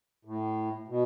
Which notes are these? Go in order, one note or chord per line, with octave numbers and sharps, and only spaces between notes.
A2
B2